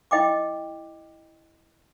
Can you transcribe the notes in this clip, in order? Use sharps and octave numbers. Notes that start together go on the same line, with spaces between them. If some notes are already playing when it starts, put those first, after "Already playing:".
E4 D#5 G5 D6